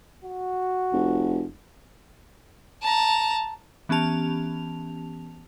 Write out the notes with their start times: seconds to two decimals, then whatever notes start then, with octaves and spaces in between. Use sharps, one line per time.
0.24 F#4
0.93 F1
2.83 A5 A#5
3.89 E3 B3 C#4 G4 A5 F7